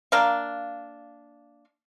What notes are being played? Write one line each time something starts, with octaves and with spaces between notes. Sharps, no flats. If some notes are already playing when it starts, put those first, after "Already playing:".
A#3 D4 F5